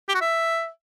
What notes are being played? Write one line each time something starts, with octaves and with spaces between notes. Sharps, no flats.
G4
F#4
E5